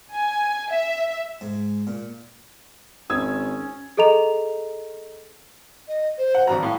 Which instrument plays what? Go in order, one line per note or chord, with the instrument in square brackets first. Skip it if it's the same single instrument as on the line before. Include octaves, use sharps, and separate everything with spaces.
[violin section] G#5
E5
[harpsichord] G#2
A#2
[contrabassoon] G#1 [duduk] C#4 [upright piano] D#6 E6 G#6
[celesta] G#4 A4 D#5 A#5 F7
[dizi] D#5
C5
[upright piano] F#5
[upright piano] G#1 G2 A#5 [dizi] F#4
[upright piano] A2 [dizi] F5